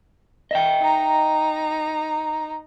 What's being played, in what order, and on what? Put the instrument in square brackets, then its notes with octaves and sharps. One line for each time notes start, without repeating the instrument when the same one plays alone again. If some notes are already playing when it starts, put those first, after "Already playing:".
[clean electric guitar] D#5 E5 G5
[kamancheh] D#4 A#5